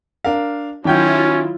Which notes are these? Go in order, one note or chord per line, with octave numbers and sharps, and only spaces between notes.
D4 A#4 F5
D#3 F#3 C#4 E4 F4 G5 G6